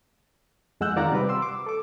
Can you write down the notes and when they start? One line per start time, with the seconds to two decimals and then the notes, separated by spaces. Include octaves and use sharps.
0.81 F2 G#3 F#5 E6 F#6 G6
0.96 D#3 F4 D5 F5 F#5 A#5
1.12 C3 G3 B4 D6
1.29 C6 E6
1.42 D6
1.66 A4 D6